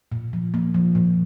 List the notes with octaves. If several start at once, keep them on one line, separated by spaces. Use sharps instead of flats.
A#2
F3
A#3
F3
A#2